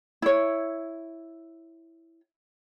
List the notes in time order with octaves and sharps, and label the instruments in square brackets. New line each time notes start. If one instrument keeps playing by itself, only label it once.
[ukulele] E4 C#5